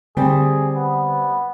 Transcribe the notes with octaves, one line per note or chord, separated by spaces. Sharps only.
D3 G3 C4 G#4
B3